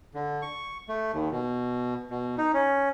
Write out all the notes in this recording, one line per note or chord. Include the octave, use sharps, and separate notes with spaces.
D3
C#6
A3
D#2
B2
B2
D#4
C#4